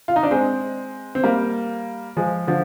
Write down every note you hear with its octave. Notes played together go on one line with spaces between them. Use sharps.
F4
D#4
D4
G#3 C4
C4
G3 A#3
F3 G#3
D3 F3